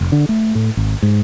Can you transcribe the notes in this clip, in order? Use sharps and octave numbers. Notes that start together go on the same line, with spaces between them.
F1
D3
A3
A2
G#1
G#2